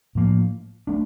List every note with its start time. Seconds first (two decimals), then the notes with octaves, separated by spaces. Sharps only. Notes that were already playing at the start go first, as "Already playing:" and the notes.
0.15 A2 F3 A#3
0.87 A3 D4